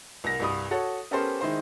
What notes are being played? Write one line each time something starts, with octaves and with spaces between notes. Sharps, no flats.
C2 A#4 A#6
C2 G2 D#6
F#4 A4 C#5
B3 C#4 G4 A4 A#4 C5
D#3 G#3 D#4 E4 C5